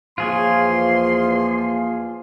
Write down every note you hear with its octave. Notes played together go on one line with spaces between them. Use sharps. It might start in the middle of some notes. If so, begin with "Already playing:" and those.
E2 F3 A#3 F4 G#4 C#5 C6